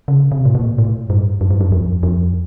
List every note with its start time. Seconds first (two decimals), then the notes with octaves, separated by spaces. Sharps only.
0.08 C#3
0.32 C3
0.45 A2
0.55 A#2
0.78 A2
1.10 G2
1.41 F#2
1.51 G2
1.61 F#2
1.72 F2
2.03 F2